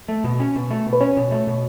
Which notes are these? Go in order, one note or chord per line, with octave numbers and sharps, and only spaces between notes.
A3
B2
C#4
B2
A3
B2
B4
C#4 C#5
B2
A3
B2